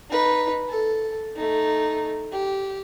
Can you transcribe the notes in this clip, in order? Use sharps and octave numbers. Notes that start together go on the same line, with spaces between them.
D#4 B4
A4
A3 D#4
G4